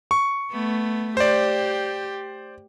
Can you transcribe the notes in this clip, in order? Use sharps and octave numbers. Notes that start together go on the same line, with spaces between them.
C#6
A3 B3
G4 C5 D5